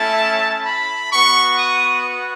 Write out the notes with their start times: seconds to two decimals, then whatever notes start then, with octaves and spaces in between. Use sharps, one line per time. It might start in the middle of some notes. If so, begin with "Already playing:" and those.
Already playing: A3 C#4 E4 A5
0.64 B5
1.11 B3 F#4 C#6
1.57 D#6